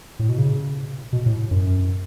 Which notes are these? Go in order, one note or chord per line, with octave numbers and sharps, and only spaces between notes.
A2
B2
C#3
B2
A2
F#2